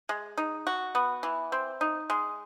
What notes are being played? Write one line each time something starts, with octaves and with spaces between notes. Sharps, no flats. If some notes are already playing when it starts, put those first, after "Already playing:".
G#3
D#4
F#4
B3
E3
C4
D#4
G#3